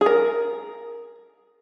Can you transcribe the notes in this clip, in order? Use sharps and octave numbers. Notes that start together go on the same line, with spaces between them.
G#4
A#4